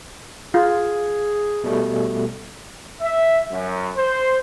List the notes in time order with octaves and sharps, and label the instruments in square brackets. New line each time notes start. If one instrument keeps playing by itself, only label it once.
[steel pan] F4 [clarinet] G#4
[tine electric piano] B2 G3 A3
[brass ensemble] E5
F#2
C5